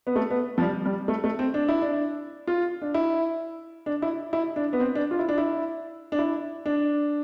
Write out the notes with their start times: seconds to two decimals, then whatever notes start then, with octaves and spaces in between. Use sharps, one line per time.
0.07 B3
0.16 A3
0.30 B3
0.58 F3
0.61 G3
0.85 G3
1.08 A3
1.24 A3
1.39 C4
1.54 D4
1.69 E4
1.82 D4
2.47 F4
2.82 D4
2.94 E4
3.86 D4
4.02 E4
4.33 E4
4.56 D4
4.73 B3
4.80 C4
4.95 D4
5.11 F4
5.19 E4
5.29 D4
5.38 E4
6.12 D4
6.19 E4
6.66 D4